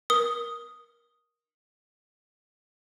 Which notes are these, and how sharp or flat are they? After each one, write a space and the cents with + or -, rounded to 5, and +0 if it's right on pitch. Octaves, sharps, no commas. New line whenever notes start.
A#4 +15 D#6 +0